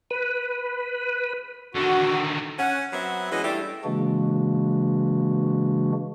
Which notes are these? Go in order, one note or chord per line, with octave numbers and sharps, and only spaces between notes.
B4
D3 D#3 F#4
C#4 F#5
F#3 B3 C4 F#4 E5
E3 G#3 C#4 F#4 D#5
G3 A3 D4 E4 G4
C#3 E3 G#3 A#3 D4 F#4